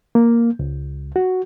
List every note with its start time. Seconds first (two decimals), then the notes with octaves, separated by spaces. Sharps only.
0.15 A#3
0.59 C#2
1.16 F#4